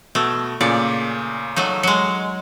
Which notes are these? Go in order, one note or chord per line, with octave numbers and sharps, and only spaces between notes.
B2 A3 E6
A#2 C#3 D5 C#7
F#3 A3 D#4
F#3 G#3 C#7